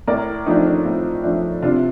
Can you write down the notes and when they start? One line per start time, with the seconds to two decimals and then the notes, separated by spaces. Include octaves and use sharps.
0.07 A2 A#4 D5
0.46 F3 A3 D4 D#4
0.66 D4
0.85 A2
1.23 F3 A3 D4
1.62 C3 D4 F4